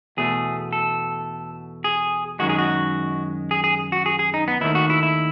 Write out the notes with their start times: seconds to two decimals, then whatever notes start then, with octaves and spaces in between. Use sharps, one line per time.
0.17 E2 B2 A3 G#4
0.73 A4
1.84 G#4
2.39 F#2 D#3 G#3 F#4
2.49 G#4
2.59 F#4
3.51 G#4
3.64 G#4
3.92 F#4
4.06 G#4
4.19 G#4
4.34 D#4
4.48 B3
4.61 D#2 D#3 A3 E4
4.75 F#4
4.90 E4
5.03 E4